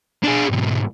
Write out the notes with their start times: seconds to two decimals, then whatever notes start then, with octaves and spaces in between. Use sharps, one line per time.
0.24 D4 G#4
0.50 B1 G#2